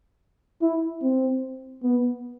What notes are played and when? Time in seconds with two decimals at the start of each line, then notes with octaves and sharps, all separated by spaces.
0.62 E4
1.02 C4
1.83 B3